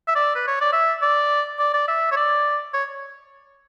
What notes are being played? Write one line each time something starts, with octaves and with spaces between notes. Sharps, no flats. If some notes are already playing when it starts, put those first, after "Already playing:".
E5
D5
B4
C#5
D5
E5
D5
D5
D5
E5
C#5
D5
C#5